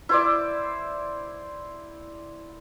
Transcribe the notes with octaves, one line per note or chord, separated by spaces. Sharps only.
E4 C5 D5